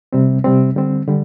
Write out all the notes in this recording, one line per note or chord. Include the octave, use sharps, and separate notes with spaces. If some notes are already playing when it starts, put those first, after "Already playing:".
C3 G3 C4
C3 G3 C4
D3 G3 C4
D3 G3